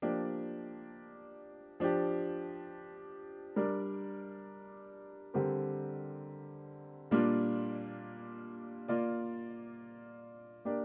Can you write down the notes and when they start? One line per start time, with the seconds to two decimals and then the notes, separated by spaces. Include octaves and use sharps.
0.02 F3 A#3 D4 G4 D5
1.80 F3 D4 G4
3.56 G3 D4 A#4 D5
5.34 D3 G3 C4 G4 A#4
7.11 A#2 G3 A#3 D4 F4
8.88 A#3 F4 D5
10.65 A#3 D4 G4 A#4 D5